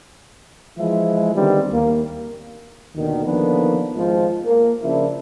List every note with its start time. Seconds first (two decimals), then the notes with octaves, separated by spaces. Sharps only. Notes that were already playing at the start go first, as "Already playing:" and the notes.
0.79 E3 F3 G#3 E4
1.35 D3 D#3 G3 B3 C4
1.72 D#2 A#3
2.96 D#2 B2 D3 D#3
3.25 D3 D#3 F3 A#3 B3 D4
3.96 G#1 F3 G#3 C4 F4
4.45 A#3
4.83 C#3 F3 A#3 D4 E4